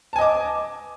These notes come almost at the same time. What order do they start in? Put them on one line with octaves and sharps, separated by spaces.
A5 G#5 D#5 D6